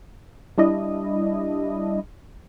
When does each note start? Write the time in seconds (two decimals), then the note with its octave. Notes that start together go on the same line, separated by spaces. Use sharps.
0.58 G3 D4 E4 D#5